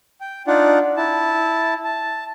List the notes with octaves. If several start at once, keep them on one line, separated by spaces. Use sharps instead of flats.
G5
D4 D#4 F4 D5 F#5
E4 A5
A5